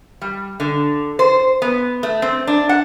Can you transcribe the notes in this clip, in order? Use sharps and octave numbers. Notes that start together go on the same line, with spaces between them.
G3
D3
C5
B3
A3
C4
D4
F#5